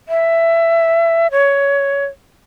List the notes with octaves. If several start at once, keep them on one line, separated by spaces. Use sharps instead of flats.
E5
C#5